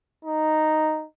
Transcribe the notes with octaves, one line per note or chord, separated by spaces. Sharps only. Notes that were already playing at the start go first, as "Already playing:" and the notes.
D#4